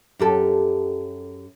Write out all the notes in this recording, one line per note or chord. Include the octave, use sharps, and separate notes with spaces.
F#2 G4 A4